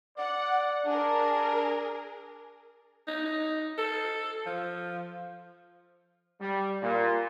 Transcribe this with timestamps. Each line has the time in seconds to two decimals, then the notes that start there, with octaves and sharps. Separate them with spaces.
0.18 D5 F#5
0.86 D4 G#4 A#4
3.07 D#4
3.25 D#4
3.78 A4
4.46 F3
6.41 G3
6.82 A#2